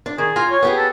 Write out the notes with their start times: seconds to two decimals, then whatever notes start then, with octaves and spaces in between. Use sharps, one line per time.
0.06 D4
0.18 D#3 G#4
0.36 F4 G#5 A#5
0.51 C#5
0.63 B3 G4 G#4
0.77 A4